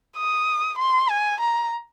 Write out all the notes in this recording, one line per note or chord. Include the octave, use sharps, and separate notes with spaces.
D#6
C6
G#5
A#5